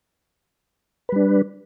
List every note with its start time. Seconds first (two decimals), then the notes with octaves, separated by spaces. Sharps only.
1.09 B4
1.12 G3
1.16 D4